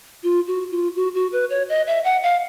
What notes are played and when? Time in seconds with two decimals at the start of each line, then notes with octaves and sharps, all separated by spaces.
0.23 F4
0.47 F#4
0.71 F4
0.96 F#4
1.15 F#4
1.32 B4
1.50 C#5
1.69 D#5
1.87 E5
2.04 F#5
2.23 F5